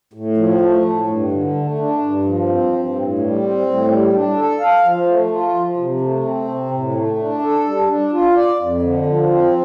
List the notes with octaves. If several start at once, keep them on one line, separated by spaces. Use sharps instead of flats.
A2
F3
A3
A2
G2
D3
A3
D4
G2
F3
C4
G2
A2
G3
C4
A2
G3
D4
A4
F5
F3
A3
F4
F3
C3
A3
C4
C3
A2
A3
D4
A4
G3
D4
F4
D5
F2
D3
F3
C4